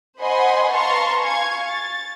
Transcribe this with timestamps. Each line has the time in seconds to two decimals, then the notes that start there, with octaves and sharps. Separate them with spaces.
0.20 C5 D#5 F#5 G#5 B5 C6
0.72 B4 F5 A5 A#5 C6 C#6
1.20 F5 G#5 C#6 G#6
1.68 A6